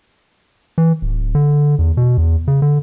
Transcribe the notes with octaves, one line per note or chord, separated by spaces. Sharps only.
E3
D1
D3
E2
B2
E2
C#3
D3